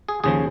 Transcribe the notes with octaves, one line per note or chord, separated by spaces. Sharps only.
G#4
D#2 C#3 F3 G#4